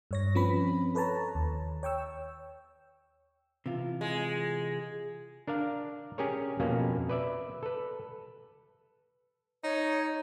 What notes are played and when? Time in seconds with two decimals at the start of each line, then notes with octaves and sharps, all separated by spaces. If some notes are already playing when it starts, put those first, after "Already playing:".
0.11 G2 C#5 A#6
0.35 F3 C4 C#4 B4 B5
0.95 A4 B4 C#5 A5 A#5
1.35 D#2
1.83 C#5 G5 C#6 E6
3.66 C3 E3 F4
4.01 G#3
5.48 D4 A#4 D5 F5
6.18 C#4 G4 G#4 A#4 C#5
6.60 F2 B2 A#3 C#4 F5
7.09 B4 D5 E5
7.63 A4 B4
9.64 D#4 C#5